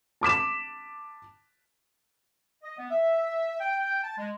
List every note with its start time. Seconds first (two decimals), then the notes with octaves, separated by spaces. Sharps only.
0.21 A5 D6 B6 E7
2.63 D#5
2.78 B3
2.91 E5
3.60 G5
4.03 A5
4.18 G#3